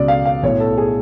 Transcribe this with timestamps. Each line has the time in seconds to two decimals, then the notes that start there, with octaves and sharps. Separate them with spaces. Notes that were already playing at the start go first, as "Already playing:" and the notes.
Already playing: C#2 B2 D5
0.08 F5
0.25 F5
0.43 B1 A2 C#5
0.60 A4
0.78 G#4